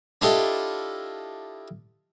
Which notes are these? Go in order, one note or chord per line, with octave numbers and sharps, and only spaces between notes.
D4 E4 F4 G4 A4 D#5